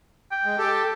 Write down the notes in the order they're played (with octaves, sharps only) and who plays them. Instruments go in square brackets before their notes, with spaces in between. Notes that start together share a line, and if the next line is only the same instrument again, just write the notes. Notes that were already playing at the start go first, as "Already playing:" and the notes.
[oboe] G5
[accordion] G#3
G4 A4